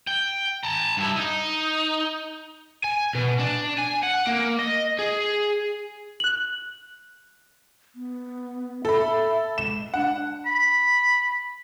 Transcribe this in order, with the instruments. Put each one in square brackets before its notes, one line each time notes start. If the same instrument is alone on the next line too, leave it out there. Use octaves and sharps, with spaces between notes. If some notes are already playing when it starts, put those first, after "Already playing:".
[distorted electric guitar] G5
A5 A#5
G2 E4
D#4
[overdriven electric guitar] G#5
B2
D4
G#5
F#5
A#3
D#5
G#4
[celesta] F#6 F#7
[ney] B3
[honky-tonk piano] A4 B5 [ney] E5
[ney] G#3 [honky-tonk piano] E7
[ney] D4 [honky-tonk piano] F#5
[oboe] B5